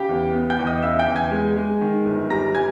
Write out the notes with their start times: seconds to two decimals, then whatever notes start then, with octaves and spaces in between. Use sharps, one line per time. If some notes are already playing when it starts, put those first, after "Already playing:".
Already playing: C#3 G4 G5
0.09 E2
0.33 B3
0.50 G5 G6
0.59 E2
0.67 D#5 D#6
0.82 C#3 E5 E6
0.99 G5 G6
1.08 E2
1.16 G#5 G#6
1.31 G#3
1.56 G#3
1.81 D#3
2.05 G1
2.30 G3 A#5 A#6
2.55 G3 G#5 G#6